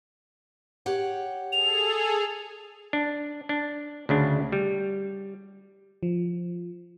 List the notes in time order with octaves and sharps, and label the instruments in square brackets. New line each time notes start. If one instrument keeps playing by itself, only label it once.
[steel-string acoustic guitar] G4 C#5 F#5
[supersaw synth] G#4 A4 [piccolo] F7
[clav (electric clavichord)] D4
D4
D2 C#3 D4
G3
[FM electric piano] F3